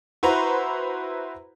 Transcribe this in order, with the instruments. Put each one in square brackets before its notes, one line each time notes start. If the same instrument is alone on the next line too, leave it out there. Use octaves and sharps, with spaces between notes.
[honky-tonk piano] E4 F#4 B4 C5 A#5